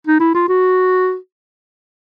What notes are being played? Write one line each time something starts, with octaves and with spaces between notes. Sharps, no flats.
D#4
E4
F4
F#4